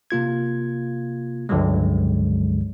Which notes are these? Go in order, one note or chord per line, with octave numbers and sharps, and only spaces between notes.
C3 A#3 F4 G#6
C#2 G2 D3 F3 F#3 G#3